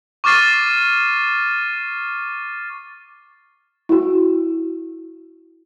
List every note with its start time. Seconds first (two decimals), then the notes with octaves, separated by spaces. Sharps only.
0.24 C#6 D6 F6 A6 C7 D#7
3.89 E4 F#4